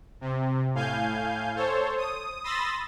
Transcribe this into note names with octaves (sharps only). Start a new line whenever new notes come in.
C3
A2 F5 G#5 G6
A4 C5 C#5
D#6
B5 C6 D#6 E6 A6 A#6